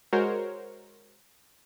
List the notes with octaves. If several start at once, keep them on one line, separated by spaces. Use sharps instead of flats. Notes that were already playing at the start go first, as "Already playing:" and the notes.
G#3 F#4 A#4 C5 C#5